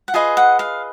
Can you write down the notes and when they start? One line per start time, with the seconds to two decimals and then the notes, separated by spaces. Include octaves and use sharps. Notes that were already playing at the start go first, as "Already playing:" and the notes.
0.08 F#5
0.14 F4 G#4 B4 D#5 G#5
0.37 F#5
0.59 F5